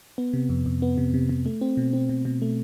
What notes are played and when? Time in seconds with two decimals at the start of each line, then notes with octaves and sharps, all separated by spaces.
0.18 B3
0.33 C3
0.49 F2
0.66 F2
0.82 B3
0.98 C3
1.14 C3
1.29 C3
1.46 A3
1.61 C4
1.77 B2
1.93 C4
2.09 B2
2.25 B2
2.42 A3